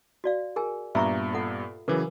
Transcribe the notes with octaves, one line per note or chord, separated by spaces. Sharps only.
F#4 D5 F5
G#4 A#4 G#5
G2 A#2 B3 E5 A#5 C#6
F4 A4 F#5
C#3 E3 F#3 A#4 B4 D6